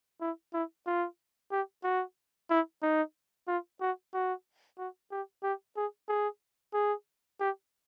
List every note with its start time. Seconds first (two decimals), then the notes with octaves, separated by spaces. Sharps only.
0.21 E4
0.53 E4
0.87 F4
1.51 G4
1.84 F#4
2.50 E4
2.82 D#4
3.48 F4
3.81 F#4
4.14 F#4
4.78 F#4
5.11 G4
5.43 G4
5.76 G#4
6.08 G#4
6.74 G#4
7.40 G4